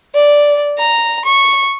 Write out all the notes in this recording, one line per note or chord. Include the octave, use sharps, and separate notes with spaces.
D5
A#5
C#6